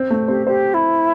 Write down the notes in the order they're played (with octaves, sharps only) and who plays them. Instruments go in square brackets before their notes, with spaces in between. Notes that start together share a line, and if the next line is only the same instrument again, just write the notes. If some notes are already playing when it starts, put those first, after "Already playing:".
Already playing: [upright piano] C4
A3
[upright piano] C4 [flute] G4
[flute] G4 [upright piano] C5
[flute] E4